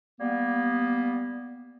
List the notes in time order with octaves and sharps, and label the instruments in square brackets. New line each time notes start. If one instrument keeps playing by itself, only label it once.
[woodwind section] G3 A#3 B3